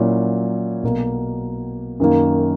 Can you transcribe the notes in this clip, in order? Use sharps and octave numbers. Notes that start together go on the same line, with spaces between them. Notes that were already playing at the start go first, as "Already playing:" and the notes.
Already playing: A#2 F#3 C#4 E4
B1 B2 A#3
F#2 D#3 A#3